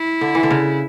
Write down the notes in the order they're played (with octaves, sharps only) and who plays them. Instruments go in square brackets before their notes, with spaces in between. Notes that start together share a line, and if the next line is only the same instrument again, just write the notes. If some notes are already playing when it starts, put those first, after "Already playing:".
Already playing: [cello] E4
[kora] D3
E3
D3
C#3